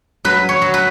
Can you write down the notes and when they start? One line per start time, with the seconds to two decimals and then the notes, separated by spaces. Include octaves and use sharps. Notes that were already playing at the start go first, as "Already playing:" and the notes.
0.25 F#3 B4
0.49 C#5
0.62 F#3
0.74 B4